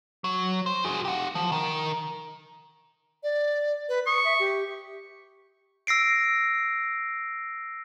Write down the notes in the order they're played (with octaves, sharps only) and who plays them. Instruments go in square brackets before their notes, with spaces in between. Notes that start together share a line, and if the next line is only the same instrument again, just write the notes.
[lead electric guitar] F#3
C5
F#4 G#4
G4 F#5
F3
D#3
[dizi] D5
B4
[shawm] C#6 [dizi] D#6
[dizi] E5
G4
[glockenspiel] E6 A#6 C7 D7